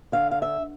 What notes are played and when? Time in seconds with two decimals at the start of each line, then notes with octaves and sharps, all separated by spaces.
0.12 D3 F5
0.31 F5
0.42 E5